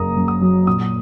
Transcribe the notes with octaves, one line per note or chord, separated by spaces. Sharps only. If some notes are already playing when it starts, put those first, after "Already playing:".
Already playing: F#1 A#3 A#5 D#6
F#2
D#6
F#3
A#2 D#6